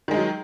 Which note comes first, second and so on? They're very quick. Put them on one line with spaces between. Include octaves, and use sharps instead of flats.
D#3 G#3 D#4 F#3